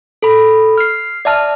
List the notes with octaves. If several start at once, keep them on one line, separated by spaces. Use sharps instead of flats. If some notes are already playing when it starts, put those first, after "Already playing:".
A4 B5
F6 C7
D5 E5 A5 F6